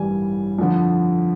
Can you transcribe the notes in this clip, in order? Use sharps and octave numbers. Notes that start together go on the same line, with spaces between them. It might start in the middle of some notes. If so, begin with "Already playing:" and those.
Already playing: A1 G2 E3 G3 G#5
F2 D3 F3